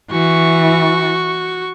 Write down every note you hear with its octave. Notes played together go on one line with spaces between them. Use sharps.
E3 F#4 C#6